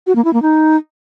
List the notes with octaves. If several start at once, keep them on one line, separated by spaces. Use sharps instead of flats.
F#4
A#3
E4
A#3
D#4